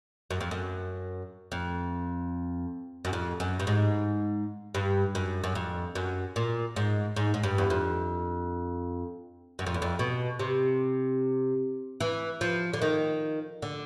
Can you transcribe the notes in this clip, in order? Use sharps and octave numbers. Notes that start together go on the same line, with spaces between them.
F#2
F2
F#2
F2
F#2
F2
F#2
G2
G#2
G2
F#2
F#2
F2
F#2
A#2
G#2
G#2
G#2
G2
E2
F2
F#2
F2
E2
F2
B2
C3
E3
F3
D3
D#3
D3